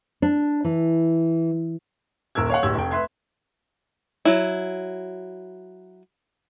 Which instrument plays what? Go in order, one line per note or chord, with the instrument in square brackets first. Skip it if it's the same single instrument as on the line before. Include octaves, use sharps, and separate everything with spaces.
[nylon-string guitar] D4
E3
[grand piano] D#1 A#4 E6 G#6
C#5 F5 F#5
D1 G4 E6 G#6
F1 G5
B4 E5 C6 G#6
[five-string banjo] F#3 E4